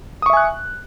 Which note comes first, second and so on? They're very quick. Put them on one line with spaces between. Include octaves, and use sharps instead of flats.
D#6 C#6 E5 G#5 F#6